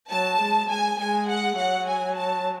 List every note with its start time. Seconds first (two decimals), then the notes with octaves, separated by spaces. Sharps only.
0.11 F#3 A5
0.41 G#3
0.70 G#3 G#5
0.99 G#3 G#5
1.29 F#5
1.58 F#3 F#5
1.88 G#5
2.17 A5